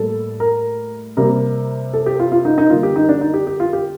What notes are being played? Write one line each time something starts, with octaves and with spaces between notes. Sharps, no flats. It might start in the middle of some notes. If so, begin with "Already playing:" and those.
Already playing: A2 G3 A#3 A4
A#4
C3 G3 A#3 A#4
A4
G4
F4
F4
D#4
D#4
D3 G3 A#3 F4
G4
D#4
D4
D#4
G4
G4
F4
G4